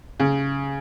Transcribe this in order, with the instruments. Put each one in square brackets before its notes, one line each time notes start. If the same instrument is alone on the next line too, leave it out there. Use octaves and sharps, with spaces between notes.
[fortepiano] C#3